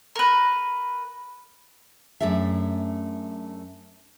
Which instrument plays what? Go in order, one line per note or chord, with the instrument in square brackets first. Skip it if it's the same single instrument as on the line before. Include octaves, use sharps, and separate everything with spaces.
[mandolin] A#4 B4
[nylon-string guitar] F#2 A3 D4 G#4 E5